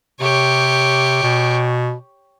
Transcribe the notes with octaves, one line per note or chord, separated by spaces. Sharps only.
C3 G4 C#5
B2